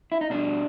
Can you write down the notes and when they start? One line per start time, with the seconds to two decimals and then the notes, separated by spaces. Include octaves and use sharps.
0.12 E4
0.21 D#4
0.30 B2 G3 D4